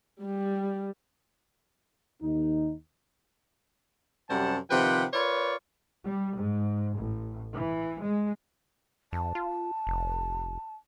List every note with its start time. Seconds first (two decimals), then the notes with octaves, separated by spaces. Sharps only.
0.20 G3
2.21 D#2 D#4
4.29 F#2 C3 G3 C5 F#5 A5
4.71 C3 D#3 F3 B4 F#5 G5
5.14 F4 A#4 B4 C#5 D5
6.06 G3
6.37 G#2
6.98 A1
7.54 E3
8.03 G#3
9.13 F2 A5
9.35 F4
9.87 F1